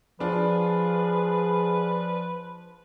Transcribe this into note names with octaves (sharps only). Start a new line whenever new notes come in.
F3 D4 F4 G#4 B4